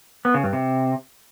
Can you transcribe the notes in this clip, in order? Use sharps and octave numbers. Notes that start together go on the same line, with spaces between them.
B3
C#3
G2
C3